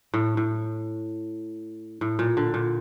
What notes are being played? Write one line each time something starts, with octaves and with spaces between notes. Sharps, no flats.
A2
A2
A2
A#2
D3
A#2